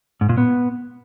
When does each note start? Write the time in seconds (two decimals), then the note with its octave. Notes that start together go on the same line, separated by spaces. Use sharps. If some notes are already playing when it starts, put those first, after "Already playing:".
0.21 G#2
0.29 A#2
0.38 B3